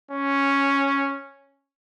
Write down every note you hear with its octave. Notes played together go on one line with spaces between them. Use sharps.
C#4